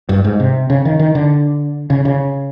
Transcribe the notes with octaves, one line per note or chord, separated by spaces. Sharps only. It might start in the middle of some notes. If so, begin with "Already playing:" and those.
G2
G#2
C3
C#3
D#3
D#3
D3
C#3
C#3